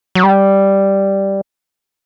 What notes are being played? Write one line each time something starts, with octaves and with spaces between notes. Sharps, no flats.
F#3
G3